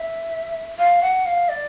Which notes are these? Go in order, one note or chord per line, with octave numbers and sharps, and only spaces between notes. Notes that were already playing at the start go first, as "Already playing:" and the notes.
Already playing: E5
F5
F#5
F5
D5